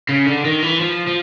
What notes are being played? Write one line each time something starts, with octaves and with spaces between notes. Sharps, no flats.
C#3
D3
D#3
E3
F3
F3